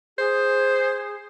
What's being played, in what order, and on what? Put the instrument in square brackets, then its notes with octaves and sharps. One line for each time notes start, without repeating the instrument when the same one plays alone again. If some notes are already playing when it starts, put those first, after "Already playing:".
[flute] G#4 [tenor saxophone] C5